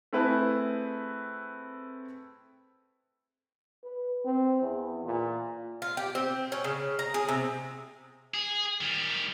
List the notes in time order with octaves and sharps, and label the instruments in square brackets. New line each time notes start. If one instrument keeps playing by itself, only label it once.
[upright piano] A3 C4 E4 G#4 B4
[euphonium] B4
C4
E2
A#2
[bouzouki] F4
G4
C4
C#4
C#3
A#5
G#4
C3
[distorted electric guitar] G#4
D#3 G3